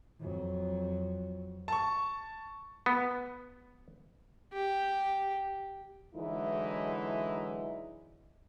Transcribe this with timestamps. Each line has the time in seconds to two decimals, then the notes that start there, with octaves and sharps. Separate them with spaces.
0.20 F2 F#3
1.68 A5 C#6
2.86 B3
4.53 G4
6.14 D3 E3 F#3 G#3 D#4 E4